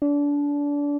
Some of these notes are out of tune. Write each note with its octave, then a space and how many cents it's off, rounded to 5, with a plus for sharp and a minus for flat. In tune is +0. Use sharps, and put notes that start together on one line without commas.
D4 -30